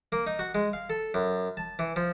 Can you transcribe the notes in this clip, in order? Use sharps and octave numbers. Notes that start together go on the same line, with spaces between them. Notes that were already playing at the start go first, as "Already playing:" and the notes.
A#3
D#4
F#4
G#3
F5
A4
F#2
A5
E3
F3